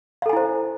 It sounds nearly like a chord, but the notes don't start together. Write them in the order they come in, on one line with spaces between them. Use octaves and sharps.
F5 A4 G#5 E4 C5